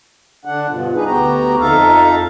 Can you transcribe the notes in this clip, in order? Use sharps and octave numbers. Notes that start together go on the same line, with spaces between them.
D3 D4 F#5
G2 B2 F3
D4 D#4 G#4 B4
D2 B3 F#4 G4 A#5
F2 D#4 A4 E5 F5 A#5